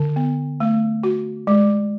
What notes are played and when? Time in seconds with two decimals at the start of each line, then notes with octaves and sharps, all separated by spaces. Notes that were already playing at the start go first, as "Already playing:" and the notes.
Already playing: D3
0.16 B3
0.60 A3
1.03 F#4
1.47 G#3